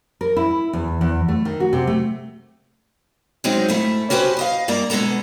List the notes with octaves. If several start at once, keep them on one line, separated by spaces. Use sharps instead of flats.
A#4
E4
E2
E2
A3
D#3
F#4
C3
A3
F#3 G#3 C4 C#4 D#4
G#2 A3 E4
C#4 F#4 G4 B4 C5
B4 D#5 F5
G2 A#3 D5 A#5
B2 G#3 B3 A4 A#5